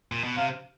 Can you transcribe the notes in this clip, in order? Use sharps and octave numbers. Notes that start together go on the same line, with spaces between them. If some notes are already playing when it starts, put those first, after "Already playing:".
A#2
B2
C3 F5